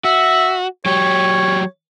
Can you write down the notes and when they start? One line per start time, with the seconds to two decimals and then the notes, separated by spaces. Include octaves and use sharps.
0.04 F#4 E5
0.86 F#3 G4 C#5